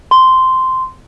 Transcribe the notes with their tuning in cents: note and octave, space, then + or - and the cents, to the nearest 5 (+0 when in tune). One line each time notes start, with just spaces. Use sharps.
C6 -10